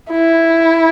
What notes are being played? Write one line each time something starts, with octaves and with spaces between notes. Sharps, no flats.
E4